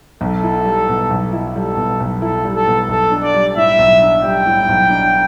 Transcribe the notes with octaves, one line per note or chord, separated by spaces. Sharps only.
B1 A4
E4
G3
B2
B1
E4
G3 A4
B2
B1
E4 A4
G3
A4
B2
B1 A4
D4
D5
G3
A2 E5
B1
D4
G3 G5
A2
B1
D4